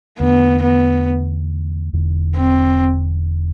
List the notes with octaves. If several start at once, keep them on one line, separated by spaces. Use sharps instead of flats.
E2 D3 A3 B3 D4
B3
E1 E2 D3
C4